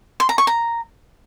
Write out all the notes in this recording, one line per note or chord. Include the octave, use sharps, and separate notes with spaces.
C6
A#5
C#6
A#5